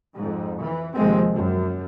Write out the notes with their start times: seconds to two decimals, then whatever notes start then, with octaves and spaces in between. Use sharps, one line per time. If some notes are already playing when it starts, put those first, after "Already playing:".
0.16 F2 G#2
0.61 E3
0.95 D#2 C3 F3 G#3 C4
1.34 F#2